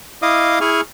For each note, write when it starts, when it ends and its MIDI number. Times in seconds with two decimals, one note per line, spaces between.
0.22 0.59 64
0.22 0.59 75
0.22 0.59 77
0.22 0.59 86
0.22 0.59 87
0.61 0.81 64
0.61 0.81 68
0.61 0.81 80
0.61 0.81 85
0.61 0.81 89